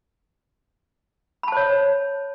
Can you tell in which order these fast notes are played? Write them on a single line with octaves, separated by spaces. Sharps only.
B5 A5 C5 C#5